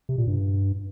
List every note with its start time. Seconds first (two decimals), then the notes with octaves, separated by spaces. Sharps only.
0.09 C3
0.18 A#2
0.27 G2